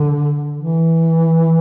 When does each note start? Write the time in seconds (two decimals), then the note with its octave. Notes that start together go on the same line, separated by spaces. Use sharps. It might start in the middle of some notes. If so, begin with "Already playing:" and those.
Already playing: D3
0.57 E3